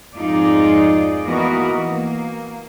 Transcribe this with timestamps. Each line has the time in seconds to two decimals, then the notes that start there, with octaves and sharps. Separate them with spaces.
0.16 F2 G#2 D#4 F4 G#4 D5
1.24 E3 A#3 B3 F#4 A#4 D#5
1.87 A#3